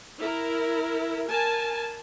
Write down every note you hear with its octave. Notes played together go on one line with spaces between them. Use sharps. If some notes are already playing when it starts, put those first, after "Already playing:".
E4 A#4
A#4 G#5 A5